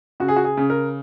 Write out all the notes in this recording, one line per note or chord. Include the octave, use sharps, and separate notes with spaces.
C#3 F#4
G#4
F#4
G#4
C#3
A#4